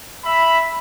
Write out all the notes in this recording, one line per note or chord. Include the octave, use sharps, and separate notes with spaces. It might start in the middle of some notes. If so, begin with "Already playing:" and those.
E5 B5